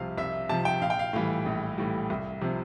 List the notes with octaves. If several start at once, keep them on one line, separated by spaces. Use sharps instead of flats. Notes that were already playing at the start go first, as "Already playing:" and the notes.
Already playing: C2 C3 F3 F5
C2 E5
C3 F3 A5
G5
A#1 F5
G5
F5
A2 E3 G3 F5
A#1
A2 E3 G3
C2
C3 F3